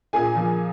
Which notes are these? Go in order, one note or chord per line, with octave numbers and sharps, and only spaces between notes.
A#2 G#4 G#5
F3